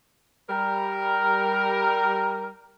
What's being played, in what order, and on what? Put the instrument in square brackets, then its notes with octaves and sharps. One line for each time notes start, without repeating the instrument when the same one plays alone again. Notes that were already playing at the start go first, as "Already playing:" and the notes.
[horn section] G3 A#4